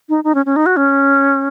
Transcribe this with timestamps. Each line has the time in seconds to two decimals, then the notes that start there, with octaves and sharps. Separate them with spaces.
0.09 D#4
0.24 D#4
0.35 C#4
0.46 C#4
0.56 D#4
0.66 F#4
0.77 C#4